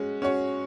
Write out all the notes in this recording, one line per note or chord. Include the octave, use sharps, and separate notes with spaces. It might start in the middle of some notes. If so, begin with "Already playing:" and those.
Already playing: G#3 C#4 F#4
C#4 F#4 C#5